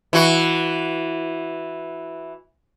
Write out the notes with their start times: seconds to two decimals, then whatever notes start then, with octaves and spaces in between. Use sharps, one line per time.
0.13 E3 F#4